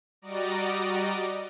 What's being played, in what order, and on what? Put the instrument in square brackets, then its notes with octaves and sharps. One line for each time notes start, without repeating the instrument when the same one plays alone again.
[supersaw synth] G3 F#4 D5 D#5 A#5 D6